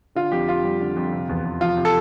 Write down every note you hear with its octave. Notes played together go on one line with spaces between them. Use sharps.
D3 F4
F2 G4
F2 F4
G3
D3
F2
C3
E2
E2
F3 F4
C3
A4